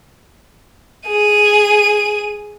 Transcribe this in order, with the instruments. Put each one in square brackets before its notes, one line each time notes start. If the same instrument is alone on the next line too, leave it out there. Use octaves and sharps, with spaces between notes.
[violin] G#4 D#7